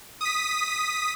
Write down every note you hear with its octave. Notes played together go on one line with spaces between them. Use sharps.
D#6 B6